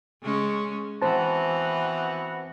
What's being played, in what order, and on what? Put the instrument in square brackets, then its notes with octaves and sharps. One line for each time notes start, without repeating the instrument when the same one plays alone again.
[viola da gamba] C#3 G#3 C#4
[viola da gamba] E3 [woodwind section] B3 C4 F#4 [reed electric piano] C5 A5